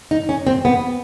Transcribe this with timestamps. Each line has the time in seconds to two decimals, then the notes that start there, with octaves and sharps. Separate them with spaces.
0.11 D#4
0.29 C#4
0.47 C4
0.65 B3